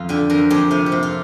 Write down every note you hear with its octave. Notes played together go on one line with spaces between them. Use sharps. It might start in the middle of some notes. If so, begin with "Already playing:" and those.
Already playing: F2 F4
D3 G4
F2 A#4
F2 G4
C3 F4
G4
C3
F4